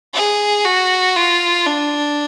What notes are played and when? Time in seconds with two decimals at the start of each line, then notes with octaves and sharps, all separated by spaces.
0.14 G#4
0.65 F#4
1.16 F4
1.66 D4